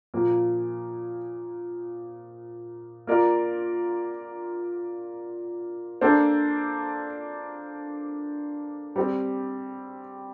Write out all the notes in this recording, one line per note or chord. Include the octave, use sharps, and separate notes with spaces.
A#2 F3 A#3
A#3 F4 A#4 D5
A#3 D4 A4 C5
G3 C4 G4